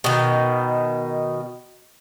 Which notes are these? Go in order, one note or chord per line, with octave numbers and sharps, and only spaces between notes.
B2 D#3